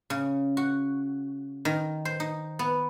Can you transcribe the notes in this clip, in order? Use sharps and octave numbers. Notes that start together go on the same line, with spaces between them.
C#3
F#4
D#3
C5
D#4
B3